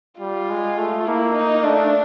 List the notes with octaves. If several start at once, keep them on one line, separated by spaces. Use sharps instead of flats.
G3 F4
G#3
A3
A#3 E4
D#4
A3 D4